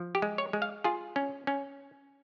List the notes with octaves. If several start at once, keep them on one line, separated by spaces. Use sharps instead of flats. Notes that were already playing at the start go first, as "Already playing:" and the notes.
Already playing: F3
G4
G#3
C#5
G#3
F5
F4 G#4
C#4
C#4